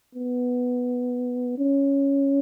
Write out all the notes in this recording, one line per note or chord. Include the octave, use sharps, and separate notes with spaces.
B3
C#4